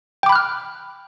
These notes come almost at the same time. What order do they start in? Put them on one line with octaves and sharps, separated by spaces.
G5 D6 B5 F#6 F6